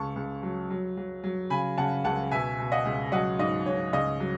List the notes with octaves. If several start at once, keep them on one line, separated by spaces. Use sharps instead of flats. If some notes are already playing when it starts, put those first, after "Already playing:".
Already playing: C#2 A5 C#6
C#2
F#3
F#3
F#3
F#3
C#3 G#5 B5
C#3 F#5 A5
C#2 F#5 A5
B2 E5 G#5
B2
D#5 F#5
C#2
F#3 D#5 F#5
G#2 D#5
G#2 C#5
C#2 D#5
F#3